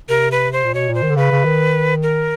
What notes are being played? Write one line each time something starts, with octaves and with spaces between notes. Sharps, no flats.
C3 A#4
B4
C5
A#2
B2 C#5
A#2
C5
D#3
D3
C#3 B4
C#3
D#3
A#4